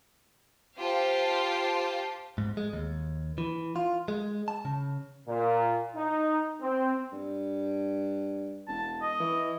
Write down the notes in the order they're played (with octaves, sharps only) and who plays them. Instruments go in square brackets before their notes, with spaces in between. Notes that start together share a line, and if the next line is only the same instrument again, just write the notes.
[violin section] F4 G4 C5 F5 A5
[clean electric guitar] G#2
G#3
D#2
E3
F4
G#3
A5
C#3
[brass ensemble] A#2
D#4
C4
[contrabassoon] G2
[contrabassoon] E1 [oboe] A5
[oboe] D#5
[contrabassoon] E3